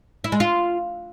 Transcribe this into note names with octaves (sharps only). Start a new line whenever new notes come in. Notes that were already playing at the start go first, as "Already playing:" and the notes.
E4
G#3
F4